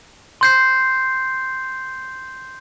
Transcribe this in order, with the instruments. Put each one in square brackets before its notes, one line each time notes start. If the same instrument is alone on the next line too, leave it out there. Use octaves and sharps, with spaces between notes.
[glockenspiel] C6 G6 C7